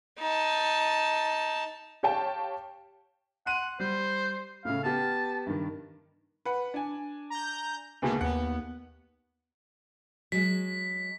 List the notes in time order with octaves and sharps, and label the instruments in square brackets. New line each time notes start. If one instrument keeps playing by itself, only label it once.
[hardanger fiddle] D#4 A5
[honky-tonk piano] G4 C#5 F5 G5 A5
[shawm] F#5 [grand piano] C6 D#7
[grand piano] G3 [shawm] C5
[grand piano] A2 C#3 [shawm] F5
[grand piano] B3 G4 [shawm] A5
[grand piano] G2 D#3
[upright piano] B4 F#5
D4 G#5
[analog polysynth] A#5 G6
[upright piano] D2 G#2 B2 [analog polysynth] A#3 B3
[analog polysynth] D#2 B3 [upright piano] F#5
[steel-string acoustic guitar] F#3 G#3 [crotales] B6